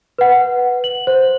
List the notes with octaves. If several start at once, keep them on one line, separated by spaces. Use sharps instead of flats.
B4 F#5
F#7
C5